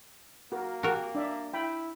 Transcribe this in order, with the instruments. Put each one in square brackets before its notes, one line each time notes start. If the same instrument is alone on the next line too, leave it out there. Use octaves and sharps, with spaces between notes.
[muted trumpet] A#3 [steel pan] F#4 A#4
[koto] F#4 A#4 [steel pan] G4 A5
[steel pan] D4 D5 E5
[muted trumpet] E4 [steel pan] G5 B5